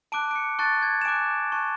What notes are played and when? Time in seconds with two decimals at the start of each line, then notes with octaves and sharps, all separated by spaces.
0.12 A5 D6 F#6 D7
0.31 D7
0.36 C#7
0.59 A5 C#6 F#6 A6
0.82 G#6
1.01 E7
1.05 G#5 D6 F#6 D7
1.52 A5 C#6 F#6